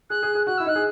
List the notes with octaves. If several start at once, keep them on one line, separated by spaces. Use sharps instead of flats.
G#4 F#6
G#4
G#4
F#4 F#6
E4 E6
D#4 F#6
G#4